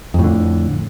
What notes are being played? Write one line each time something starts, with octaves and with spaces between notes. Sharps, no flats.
F2 A2 D3